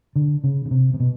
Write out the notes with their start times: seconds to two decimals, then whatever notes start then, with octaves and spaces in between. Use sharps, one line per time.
0.16 D3
0.44 C#3
0.65 C#3
0.71 C3
0.94 C3
1.00 B2